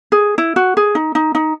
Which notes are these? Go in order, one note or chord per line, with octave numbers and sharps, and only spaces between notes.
G#4
E4
F#4
G#4
D#4
D#4
D#4